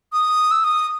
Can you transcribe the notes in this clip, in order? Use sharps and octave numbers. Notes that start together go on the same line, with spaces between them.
D#6
E6
D#6